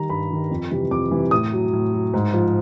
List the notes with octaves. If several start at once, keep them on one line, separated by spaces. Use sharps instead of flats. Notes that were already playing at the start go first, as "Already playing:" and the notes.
Already playing: D#3 G3 A#5
G2 B5
D#3 G3
F2
C3 E3 G3
F2 D6
C3 E3 G3
A2 D#6
F#3
A2
F#3
G#2
F3